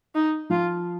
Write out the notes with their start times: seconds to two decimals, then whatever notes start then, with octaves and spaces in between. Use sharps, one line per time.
0.15 D#4
0.50 F3 F4